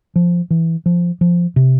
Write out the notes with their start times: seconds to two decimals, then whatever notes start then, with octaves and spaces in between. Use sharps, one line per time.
0.16 F3
0.51 E3
0.86 F3
1.21 F3
1.56 C3